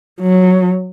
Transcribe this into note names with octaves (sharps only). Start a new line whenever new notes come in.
F#3